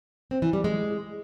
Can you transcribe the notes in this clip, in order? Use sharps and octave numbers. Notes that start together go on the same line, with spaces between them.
C4
E3
G3
G#3